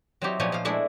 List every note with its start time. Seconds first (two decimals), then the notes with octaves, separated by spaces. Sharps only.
0.21 F#3 C4 D#4 E4 G4 C#5
0.39 A#2 F3 B3 D#4 C#5 G#5
0.52 F3 F5
0.65 G#3 A3 D4 E4 G#4